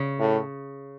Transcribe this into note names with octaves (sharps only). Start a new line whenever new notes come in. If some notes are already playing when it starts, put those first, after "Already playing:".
Already playing: C#3
A2